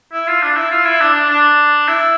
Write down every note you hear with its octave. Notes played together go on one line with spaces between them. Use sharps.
E4
F4
D4
E4
F4
E4
D4
D4
D4
E4